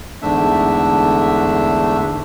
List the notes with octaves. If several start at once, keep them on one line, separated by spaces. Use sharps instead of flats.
E2 G#2 D3 A3 D4 E5